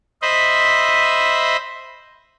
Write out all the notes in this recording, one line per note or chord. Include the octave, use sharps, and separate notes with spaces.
C5 D#5 E5 B5